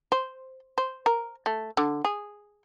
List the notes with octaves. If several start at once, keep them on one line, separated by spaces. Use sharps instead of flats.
C5
C5
A#4
A3
D3
G#4